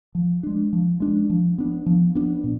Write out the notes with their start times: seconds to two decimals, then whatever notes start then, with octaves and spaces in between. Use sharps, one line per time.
0.15 F3
0.43 G#3 D4
0.73 F3
1.00 G#3 D4
1.30 F3
1.58 B3 D4
1.86 F3
2.15 B3 D4
2.44 A#2